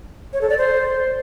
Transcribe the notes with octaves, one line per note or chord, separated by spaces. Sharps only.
C#5
A4
D5
C5